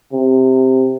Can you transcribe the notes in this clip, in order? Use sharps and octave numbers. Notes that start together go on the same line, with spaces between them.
C3